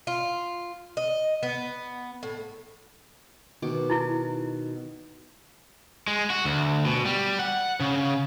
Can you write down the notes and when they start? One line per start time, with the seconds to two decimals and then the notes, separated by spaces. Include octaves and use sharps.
0.07 F4
0.97 D#5
1.43 B3
2.23 A2
3.62 B2 D#3 D6
3.90 D#4 E4
6.08 G#3
6.30 F#4
6.45 D2
6.85 B2
7.06 G3
7.39 F#5
7.80 C#3